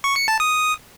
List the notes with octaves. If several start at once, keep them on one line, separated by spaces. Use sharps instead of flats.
C#6
C#7
A5
D#6